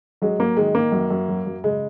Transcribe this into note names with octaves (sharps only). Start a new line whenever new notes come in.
F#3 G#3
F#3 A#3
D#3 G#3
D#3 A#3
F#2
F#2
F#3
F#2
C#3 G#3